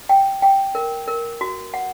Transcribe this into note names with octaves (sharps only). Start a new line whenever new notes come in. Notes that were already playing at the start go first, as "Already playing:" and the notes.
G5
G5
A#4
A#4
F#4
F#5